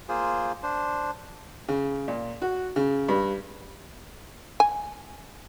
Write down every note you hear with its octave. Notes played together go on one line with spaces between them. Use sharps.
A#3 F4 G#4 C5
D4 C5
C#3
A#2
F#4
C#3
G2
G#5